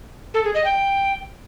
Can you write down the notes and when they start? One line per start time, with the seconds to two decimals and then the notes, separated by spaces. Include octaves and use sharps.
0.34 A4
0.44 G#4
0.54 D#5
0.65 G5